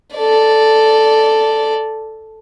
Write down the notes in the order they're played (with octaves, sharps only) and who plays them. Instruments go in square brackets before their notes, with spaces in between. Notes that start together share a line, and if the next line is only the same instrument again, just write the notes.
[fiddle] A4 D5